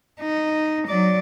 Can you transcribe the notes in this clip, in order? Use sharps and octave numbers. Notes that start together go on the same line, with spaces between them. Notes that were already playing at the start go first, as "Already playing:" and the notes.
D#4
F#3 D5